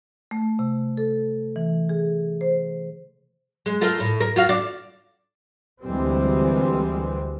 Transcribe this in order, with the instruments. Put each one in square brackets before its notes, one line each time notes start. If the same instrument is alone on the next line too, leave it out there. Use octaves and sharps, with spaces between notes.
[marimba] A3
C3
A4
E3
G#4
C5
[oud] G#3
A3 F4 A#4
A2
A#4
F4 F#4 F5
D4
[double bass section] D2 E3 G3 G#3 C4